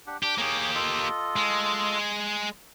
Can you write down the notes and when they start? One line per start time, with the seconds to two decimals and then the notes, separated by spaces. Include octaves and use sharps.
0.07 D4 G4 F#5
0.23 D4 G4
0.38 A#3 G4 G#4 C#5 D#6
0.75 F4 A4 D#5
1.36 G#3